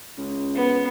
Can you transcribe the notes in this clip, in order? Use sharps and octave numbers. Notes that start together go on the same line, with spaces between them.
C#2
B3